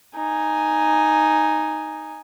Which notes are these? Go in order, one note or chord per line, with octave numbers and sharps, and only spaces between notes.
D#4 G#5